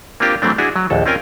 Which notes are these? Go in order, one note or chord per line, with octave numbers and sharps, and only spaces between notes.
A#3 C4 D4 F4 G4 A#4
E3 F#3 A3 C4 D4
D4 E4 F#4 G#4
F#3
A#1 D#2 A4
C4 C#4 F4 A#4 G5 G#5